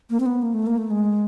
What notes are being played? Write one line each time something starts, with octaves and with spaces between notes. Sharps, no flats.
A#3
C4
B3
A#3
A3
A#3
A3
G#3